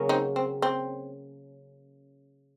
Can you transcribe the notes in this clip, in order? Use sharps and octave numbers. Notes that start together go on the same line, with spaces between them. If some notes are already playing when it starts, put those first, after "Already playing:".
Already playing: C#3 F#3 A#3 C#4
C4 D#4
C4
C4